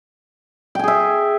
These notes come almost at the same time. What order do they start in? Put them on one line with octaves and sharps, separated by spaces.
G5 G#5 G#4 E5